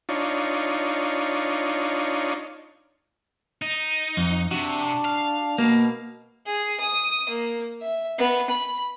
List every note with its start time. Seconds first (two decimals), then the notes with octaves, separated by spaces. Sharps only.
0.09 D4 D#4 F4 C#5
3.62 D#4
4.17 F2
4.51 C3 D4 F#4
5.05 F5
5.58 B2 A#3
6.46 G#4
6.80 D#6
7.29 A#3
7.81 E5
8.18 B3
8.50 B5